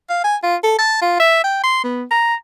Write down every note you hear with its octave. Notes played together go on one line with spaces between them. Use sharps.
F5
G#5
F4
A4
A5
F4
E5
G5
C6
B3
A#5